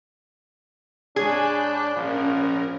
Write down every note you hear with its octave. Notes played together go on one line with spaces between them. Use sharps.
G#2 D4 G#4 C#5 G#5 B5 F#6 G6
A#1 F3 C#4 A#4